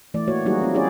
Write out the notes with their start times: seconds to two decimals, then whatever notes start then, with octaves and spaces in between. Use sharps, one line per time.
0.14 E3 A3 D5
0.28 A#3 F#4 C#5
0.45 F#3 G3 A#3 D#4 F#4 G#4
0.62 C4 F4
0.74 C#4 E4 G4 G#4 C#5 D5